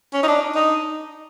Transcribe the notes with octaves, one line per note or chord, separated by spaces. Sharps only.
C#4
D#4
D4
D#4